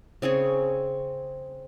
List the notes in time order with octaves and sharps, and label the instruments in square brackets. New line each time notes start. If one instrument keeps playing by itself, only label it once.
[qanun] C#3 C4 G#4 C#5